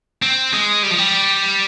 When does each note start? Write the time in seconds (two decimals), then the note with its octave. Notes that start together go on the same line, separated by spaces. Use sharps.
0.22 C4
0.53 G#3
0.83 G3
0.91 F3
0.98 G3